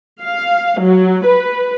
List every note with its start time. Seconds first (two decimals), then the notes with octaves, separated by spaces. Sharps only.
0.23 F5
0.82 F#3
1.26 B4